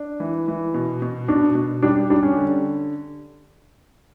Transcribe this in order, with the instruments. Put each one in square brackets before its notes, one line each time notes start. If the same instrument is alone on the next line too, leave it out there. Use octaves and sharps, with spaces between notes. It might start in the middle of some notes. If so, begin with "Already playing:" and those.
Already playing: [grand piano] D4
E3
E3
B2
B2
[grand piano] B2 [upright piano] D4
[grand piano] B2
[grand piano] G3 [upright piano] D4
[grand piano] G3 [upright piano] D4
[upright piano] C#4
[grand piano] D3